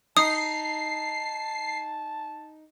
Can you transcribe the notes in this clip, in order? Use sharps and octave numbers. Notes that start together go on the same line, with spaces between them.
D#4 A5 D#6 C7